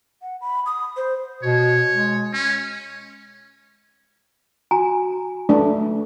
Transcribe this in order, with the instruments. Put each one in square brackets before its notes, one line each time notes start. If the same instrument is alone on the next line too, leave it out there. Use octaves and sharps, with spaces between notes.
[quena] F#5
B5
D#6
C5
[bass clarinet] B2 [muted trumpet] C#5
[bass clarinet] G#3
[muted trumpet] C#4
[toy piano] F#4 G#5 A#5
[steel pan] A3 D4